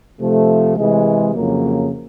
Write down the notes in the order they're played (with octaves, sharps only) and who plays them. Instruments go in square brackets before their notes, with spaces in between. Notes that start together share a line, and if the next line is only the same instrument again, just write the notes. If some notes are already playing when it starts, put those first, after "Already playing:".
[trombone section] C3 F3 A3
C3 E3 G#3
F2 C#3 F#3 A#3